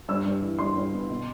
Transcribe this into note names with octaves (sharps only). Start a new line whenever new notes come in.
G2 E6
G2
E3
G2 C6
G2
B3
B2